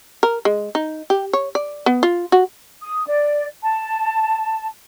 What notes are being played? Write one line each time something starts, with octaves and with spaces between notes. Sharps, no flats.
A#4
G#3
D#4
G4
C#5
D5
B3
F4
F#4
D#6
D5
A5